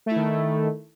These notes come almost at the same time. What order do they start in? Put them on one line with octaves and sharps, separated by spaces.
A3 E4 D#3